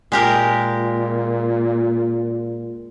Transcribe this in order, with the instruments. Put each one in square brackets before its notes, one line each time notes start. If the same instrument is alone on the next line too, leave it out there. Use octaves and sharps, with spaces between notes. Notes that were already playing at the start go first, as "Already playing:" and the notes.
[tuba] A#2 [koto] G#3 G4 A#4